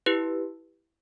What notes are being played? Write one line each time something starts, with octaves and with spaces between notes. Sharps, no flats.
E4 G4 B4